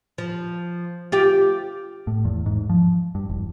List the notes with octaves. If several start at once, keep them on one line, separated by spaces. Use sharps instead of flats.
F3
F4 G4
A2
E2
G#2
F3
G2
E1